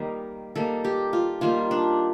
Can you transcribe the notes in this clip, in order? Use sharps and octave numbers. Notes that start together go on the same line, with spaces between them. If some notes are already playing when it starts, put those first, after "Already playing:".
Already playing: D#3 G3 A#3
D#3 G3 A#3 A4
G4
F4
D#3 G3 A#3 F4
D4